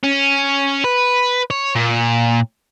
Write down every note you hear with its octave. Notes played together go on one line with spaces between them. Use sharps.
C#4
B4
C#5
A#2